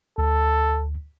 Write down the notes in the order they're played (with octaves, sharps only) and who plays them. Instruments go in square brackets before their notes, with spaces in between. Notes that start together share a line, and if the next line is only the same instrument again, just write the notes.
[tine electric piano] D2 [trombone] A4